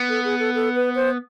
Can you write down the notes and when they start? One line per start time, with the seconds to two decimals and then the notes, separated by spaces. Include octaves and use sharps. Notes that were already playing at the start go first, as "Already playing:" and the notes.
Already playing: B3
0.09 A4
0.24 G#4
0.39 A4
0.55 A4
0.75 B4
0.95 C5